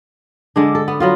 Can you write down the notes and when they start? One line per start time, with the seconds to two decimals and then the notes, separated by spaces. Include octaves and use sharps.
0.56 D3 G#3 D4
0.75 A4
0.88 B3
1.00 F#3 B3 F4